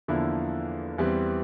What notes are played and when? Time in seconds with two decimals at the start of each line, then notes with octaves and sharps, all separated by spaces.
0.08 E2 D3 F3 A#3 E4
0.98 E2 E3 G3 C4